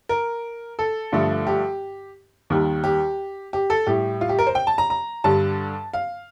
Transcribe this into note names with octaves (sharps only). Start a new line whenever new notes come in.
A#4
A4
G2 D3 F3 A3
G4
D#2 D#3 G3
G4
G4
A4
A2 G3 G4
F4
G4
A#4
C5
G5
A5
A#5
A#5
G2 D3 G3 A5
F5